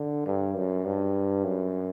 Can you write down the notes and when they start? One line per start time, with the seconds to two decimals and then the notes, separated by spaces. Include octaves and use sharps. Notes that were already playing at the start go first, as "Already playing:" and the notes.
Already playing: D3
0.26 G2
0.56 F#2
0.85 G2
1.44 F#2